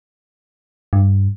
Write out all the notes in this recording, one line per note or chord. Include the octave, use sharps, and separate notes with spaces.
G2